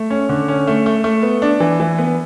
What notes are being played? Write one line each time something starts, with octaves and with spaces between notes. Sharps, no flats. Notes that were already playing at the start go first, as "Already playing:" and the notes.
Already playing: A3
C#4
D3
C#4
A3
A3
A3
B3
D4
E3
E3
B3